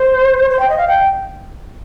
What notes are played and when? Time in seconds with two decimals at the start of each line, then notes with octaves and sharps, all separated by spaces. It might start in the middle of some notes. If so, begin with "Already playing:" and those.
Already playing: C5
0.50 C5
0.59 G5
0.70 D#5
0.78 F5
0.88 G5